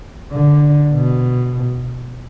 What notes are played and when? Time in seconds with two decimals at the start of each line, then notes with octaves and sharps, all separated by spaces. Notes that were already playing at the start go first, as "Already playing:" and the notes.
0.32 D3
0.94 B2